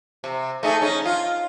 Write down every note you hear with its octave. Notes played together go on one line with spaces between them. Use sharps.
C3
A3 D#4 G#4
C#4 D#4
F4